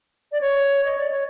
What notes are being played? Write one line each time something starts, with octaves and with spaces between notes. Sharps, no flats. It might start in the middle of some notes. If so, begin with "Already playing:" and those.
D5
C#5
D#5
D5
C#5